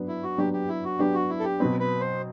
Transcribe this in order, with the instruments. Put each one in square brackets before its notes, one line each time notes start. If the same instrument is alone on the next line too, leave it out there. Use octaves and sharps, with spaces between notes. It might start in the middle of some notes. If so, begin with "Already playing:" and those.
Already playing: [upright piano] F#3 B3 D4
[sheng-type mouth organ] E4
F#4
[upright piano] F#3 B3 D4 [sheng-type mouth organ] G4
[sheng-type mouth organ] G4
E4
F#4
[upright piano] F#3 B3 D4 [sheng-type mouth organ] G4
[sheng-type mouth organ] F#4
E4
A4
G4
[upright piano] B2 F#3 C4 [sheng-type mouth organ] B4
[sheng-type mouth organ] B4
C5